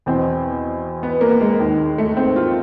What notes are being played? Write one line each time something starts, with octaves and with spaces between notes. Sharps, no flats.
E2 B2 C4
B3
A#3
G#3
D#2 D#3
A3
C4
F4